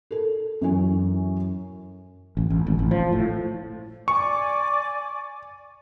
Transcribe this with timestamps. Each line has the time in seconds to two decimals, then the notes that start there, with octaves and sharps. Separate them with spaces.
0.11 A4 A#4
0.61 F#2 E3 C#4
2.37 A1
2.50 A1
2.67 G#1
2.79 A1
2.91 F3
3.12 A2
4.08 D5 G#5 C#6 D6